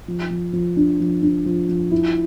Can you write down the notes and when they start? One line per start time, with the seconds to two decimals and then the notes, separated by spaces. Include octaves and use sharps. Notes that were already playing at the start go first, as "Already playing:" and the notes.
0.08 F3
0.30 F3
0.53 F3
0.77 D4
1.00 F3
1.22 D4
1.46 F3
1.69 F3
1.91 E4